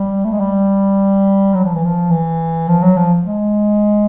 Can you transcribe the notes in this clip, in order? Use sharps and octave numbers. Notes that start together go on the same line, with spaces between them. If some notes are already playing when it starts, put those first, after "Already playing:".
Already playing: G3
A3
G#3
G3
F#3
F3
E3
F3
E3
F3
F#3
F3
G#3